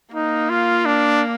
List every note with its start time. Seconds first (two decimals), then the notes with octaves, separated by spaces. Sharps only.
0.14 A#3 D#4
0.50 F4
0.85 D4